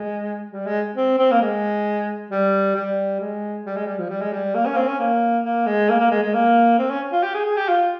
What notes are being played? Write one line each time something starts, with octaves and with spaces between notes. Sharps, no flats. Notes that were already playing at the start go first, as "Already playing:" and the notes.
Already playing: G#3
G3
G#3
C4
C4
A#3
G#3
G3
G3
G#3
G3
G#3
G3
F3
G3
G#3
G3
A#3
C#4
A#3
C4
C#4
A#3
A#3
G#3
A#3
A#3
G#3
G#3
A#3
C4
C#4
F4
G4
G#4
G#4
G4
F4